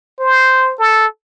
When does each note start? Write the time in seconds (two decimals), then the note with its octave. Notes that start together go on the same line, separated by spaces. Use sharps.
0.20 C5
0.79 A4